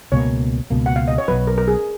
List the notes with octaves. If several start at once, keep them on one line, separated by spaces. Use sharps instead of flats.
C#2 B2 A#3 C#5
C#2 B2 A#3
F#5
F5
D#5
C#5
B1 B2 F#3 B4
A#4
A#4
G#4